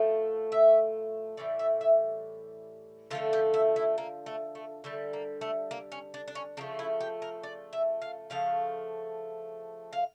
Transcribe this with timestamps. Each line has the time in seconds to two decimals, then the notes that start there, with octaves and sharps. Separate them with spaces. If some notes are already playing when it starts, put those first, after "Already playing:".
Already playing: A2 F3 A3
0.52 E5
1.37 A2 E3 G3 D5
1.59 E5
1.81 E5
3.11 D3 F3 A3 F4
3.33 G4
3.54 E4
3.76 E4
3.98 A#3
4.26 A3
4.55 A3
4.84 D3 G3 A3
5.13 A#3
5.41 A3
5.71 A#3
5.92 C#4
6.14 D4
6.28 D4
6.35 C#4
6.57 C#3 F3 A3 D4
6.79 E4
7.01 G4
7.22 A#4
7.43 D5
7.73 E5
8.02 F5
8.30 C#3 F3 A3 F5
9.93 F5